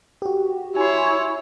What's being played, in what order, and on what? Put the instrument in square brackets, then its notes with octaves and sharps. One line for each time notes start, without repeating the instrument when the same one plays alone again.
[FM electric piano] F#4 G4
[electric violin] E4 C#5 [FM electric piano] G#5 C6